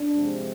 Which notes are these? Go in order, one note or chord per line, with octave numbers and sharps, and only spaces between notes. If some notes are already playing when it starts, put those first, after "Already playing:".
Already playing: D4
C3 F3 G#3